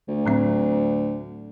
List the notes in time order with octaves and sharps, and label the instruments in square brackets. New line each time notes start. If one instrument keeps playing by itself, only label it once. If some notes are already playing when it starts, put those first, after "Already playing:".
[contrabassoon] D2
[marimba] A2 F#3 C4